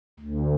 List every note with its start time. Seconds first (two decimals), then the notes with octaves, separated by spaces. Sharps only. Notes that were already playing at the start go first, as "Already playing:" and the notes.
0.20 D2